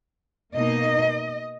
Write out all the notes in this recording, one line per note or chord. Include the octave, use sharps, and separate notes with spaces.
B2 A#3 D#4 D#5